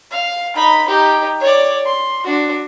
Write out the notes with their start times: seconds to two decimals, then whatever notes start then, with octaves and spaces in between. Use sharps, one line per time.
0.11 F5
0.56 D#4 B5
0.86 D#4 G4
1.40 C#5 D5
1.85 C6
2.24 D4 F#4